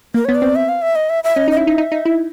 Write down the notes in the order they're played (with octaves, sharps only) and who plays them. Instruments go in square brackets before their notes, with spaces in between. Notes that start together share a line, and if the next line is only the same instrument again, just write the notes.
[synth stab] A#3 [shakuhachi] A#4
[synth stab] B3 [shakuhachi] C#5
[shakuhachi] D5
[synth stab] C4
[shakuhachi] E5
F5
E5
D#5
E5
E5
[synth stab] C#4 [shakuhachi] D#5
[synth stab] D#4
[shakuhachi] D#5
[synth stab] E4 [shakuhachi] E5
[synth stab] D#4
D#4
D#4
E4